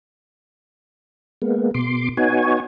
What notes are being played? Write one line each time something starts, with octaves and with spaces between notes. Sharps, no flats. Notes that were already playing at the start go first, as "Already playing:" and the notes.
G#3 A#3 B3
B2 C6 D6
B3 D#4 F#4 C#5 G#5